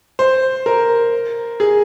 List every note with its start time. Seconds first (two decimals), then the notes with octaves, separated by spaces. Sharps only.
0.19 C5
0.66 A#4
1.60 G#4